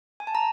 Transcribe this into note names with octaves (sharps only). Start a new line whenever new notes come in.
G#5
A5
A#5